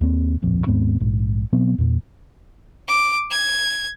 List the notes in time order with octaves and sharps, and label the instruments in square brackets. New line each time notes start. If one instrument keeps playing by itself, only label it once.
[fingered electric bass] D#2 A#3 C4
D1 A#1 F2
D#2 G#2 B3 C4
A#1 G#2
B2 F#3 B3 C4
E2 A#2
[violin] D6
G#6